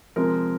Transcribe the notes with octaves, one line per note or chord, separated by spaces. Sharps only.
C3 F3 G#3 A#4